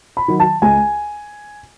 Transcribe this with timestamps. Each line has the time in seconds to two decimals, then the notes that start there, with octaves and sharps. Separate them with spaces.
0.17 B5
0.28 D#3 F#3
0.40 A5
0.62 C#2 G#5